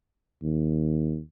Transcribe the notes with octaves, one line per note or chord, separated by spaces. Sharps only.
D#2